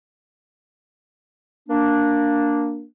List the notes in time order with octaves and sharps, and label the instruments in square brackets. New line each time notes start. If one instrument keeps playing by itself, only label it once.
[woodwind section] A#3 D4